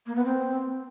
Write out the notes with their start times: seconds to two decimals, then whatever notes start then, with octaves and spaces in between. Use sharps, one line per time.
0.06 A#3
0.16 B3
0.25 C4